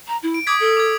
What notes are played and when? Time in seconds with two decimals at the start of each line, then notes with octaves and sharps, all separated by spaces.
0.07 A#5
0.22 E4
0.34 D7
0.47 D6 D#6 G#6 B6
0.60 A4
0.77 D6 G#6